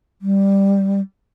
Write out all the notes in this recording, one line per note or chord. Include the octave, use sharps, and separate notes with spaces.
G3